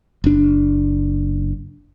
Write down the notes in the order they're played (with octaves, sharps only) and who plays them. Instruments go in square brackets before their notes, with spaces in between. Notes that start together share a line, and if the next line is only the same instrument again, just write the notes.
[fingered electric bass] F#1 D4